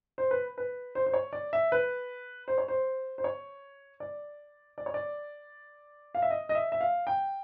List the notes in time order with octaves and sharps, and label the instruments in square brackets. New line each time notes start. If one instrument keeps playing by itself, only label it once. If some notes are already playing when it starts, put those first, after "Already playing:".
[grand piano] C5
B4
B4
C5
C5
C#5
D5
E5
B4
C5
C#5
C5
C5
C#5
D5
D5
C#5
D5
F5
E5
D#5
D#5
E5
E5
F5
G5